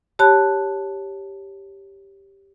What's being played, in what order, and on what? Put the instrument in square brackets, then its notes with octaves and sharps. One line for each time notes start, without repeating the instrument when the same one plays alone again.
[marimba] G4 C#5 A5 B5 F#6